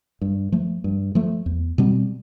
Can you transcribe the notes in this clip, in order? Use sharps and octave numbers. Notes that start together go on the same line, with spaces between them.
G2
F3 A3
G2
F3 A3
E2
B2 G3 C4